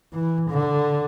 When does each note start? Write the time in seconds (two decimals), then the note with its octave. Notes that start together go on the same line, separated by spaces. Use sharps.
0.13 E3
0.50 D3